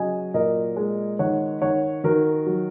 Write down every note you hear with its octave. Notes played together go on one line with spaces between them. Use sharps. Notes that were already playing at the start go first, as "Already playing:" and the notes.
Already playing: C#3 F#3 D#5 G#5
A#2 A#4 D#5
G#3
D#3 C#5 F#5
D#3 C#5 F#5
D#3 F#4 A#4
F#3